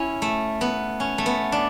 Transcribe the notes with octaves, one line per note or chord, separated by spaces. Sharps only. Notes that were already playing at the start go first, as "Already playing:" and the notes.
Already playing: C#4 E4
A3
B3
C#4
A3
B3
D4